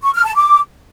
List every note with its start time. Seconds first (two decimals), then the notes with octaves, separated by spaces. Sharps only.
0.02 C#6
0.14 F6
0.25 A5
0.36 D6